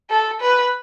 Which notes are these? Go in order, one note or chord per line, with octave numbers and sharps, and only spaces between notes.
A4
B4